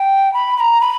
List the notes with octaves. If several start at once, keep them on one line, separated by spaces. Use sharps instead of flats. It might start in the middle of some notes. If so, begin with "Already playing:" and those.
Already playing: G5
B5
B5
A#5
B5